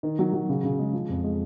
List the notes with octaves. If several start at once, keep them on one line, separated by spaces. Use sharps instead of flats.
D#3
F#3
F#3
C#3
C#3
G#3
F3
F2
G#3